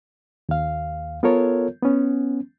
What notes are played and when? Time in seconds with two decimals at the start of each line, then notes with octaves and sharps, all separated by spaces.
0.49 D#2 F5
1.23 B3 F4 A4 A#4 C#5
1.83 B3 C#4